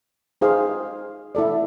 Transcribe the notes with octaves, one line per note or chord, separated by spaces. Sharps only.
D#4 G#4 C5 F5
E4 A4 D5